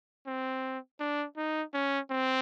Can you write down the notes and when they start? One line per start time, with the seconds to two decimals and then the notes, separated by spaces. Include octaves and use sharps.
0.27 C4
1.00 D4
1.37 D#4
1.74 C#4
2.11 C4